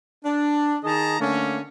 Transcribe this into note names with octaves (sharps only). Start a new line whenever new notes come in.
D4
D#3 G#4 D#5 A5 A#5
D3 A3 A#3 C#4